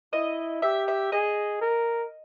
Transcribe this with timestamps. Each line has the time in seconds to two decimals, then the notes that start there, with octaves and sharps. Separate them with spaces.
0.13 E4 D#5
0.62 G4 E5
0.88 E5
1.12 G#4 D#5
1.61 A#4